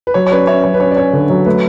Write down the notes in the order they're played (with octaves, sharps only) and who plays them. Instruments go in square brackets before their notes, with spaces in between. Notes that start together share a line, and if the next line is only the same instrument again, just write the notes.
[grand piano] B4
[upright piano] F#3 [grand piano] C#5
[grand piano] C#5
[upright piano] C#4 [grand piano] B4 D5
[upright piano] C#4 [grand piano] C#5 E5
[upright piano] F#3 [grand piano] C#5
[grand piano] B4
[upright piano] C#4 [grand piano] C#5
[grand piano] D5
[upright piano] C#4 [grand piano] C#5
[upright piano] D3 [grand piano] B4
[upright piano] F#3
[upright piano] A3 [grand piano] B4